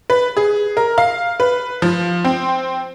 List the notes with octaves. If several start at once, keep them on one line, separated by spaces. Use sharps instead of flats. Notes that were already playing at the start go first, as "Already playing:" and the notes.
B4
G#4
A#4
F5
B4
F3
C4